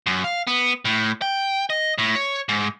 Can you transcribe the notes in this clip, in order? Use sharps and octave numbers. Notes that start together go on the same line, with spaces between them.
F#2
F5
B3
A2
G5
D#5
A2
C#5
G#2